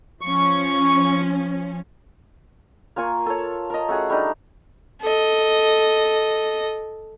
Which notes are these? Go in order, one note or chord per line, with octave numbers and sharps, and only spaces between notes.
F3 C#4 C#6
A#3 F4 G#5 C#6
A4 C#5
A#4 D#5
A3 C#4 F#4 G#4
G3 A3 D4 D#4
A4 D#5